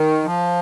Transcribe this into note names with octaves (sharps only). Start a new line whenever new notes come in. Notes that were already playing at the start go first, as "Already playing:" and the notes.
Already playing: D#3
F3